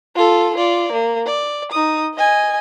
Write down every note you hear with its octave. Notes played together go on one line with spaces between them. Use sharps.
F4 A4
F4 D5
A#3
D5
D#4 D#6
D#5 G#5